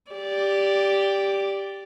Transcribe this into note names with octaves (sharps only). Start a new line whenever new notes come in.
G4 D5